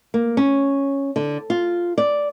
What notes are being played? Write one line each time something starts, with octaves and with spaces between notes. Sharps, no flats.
A#3
C#4
D3
F4
D5